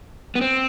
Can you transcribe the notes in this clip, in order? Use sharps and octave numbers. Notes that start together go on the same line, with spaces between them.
B3
C4